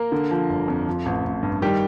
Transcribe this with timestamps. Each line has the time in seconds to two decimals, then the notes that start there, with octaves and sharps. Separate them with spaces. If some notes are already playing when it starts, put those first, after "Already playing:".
Already playing: A#3 A#4
0.12 D3
0.31 F3
0.49 G1
0.68 F2
0.87 F3
1.06 A1
1.24 A1
1.43 G2
1.62 D#3 G3 G4